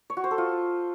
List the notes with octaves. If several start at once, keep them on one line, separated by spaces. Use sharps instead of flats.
C#5
F#4
C5
A4
F4